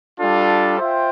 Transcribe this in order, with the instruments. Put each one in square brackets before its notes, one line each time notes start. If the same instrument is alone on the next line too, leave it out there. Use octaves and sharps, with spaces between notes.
[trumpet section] G3 D4 F4 A4
F4 C5 E5 G5